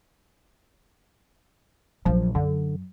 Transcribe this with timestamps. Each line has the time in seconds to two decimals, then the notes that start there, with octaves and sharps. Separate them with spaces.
2.05 A#1 F3 F#3
2.35 F#2 D3